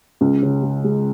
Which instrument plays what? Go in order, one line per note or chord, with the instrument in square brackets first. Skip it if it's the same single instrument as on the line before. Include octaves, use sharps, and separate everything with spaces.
[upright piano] C#2
C#3
G#3
G#3